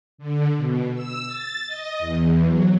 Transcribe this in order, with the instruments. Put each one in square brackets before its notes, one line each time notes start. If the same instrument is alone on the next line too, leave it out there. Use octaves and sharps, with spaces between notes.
[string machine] D3
B2
E6
A6
D#5
E2
F#3